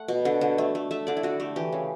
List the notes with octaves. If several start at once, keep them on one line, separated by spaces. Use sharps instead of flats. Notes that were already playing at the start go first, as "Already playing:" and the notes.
Already playing: A3 F#5
B2
D3
D3
A3
A3
A3 E5
D3 D5
E4
D3 F#4
A3 G4
E3 G4
C#3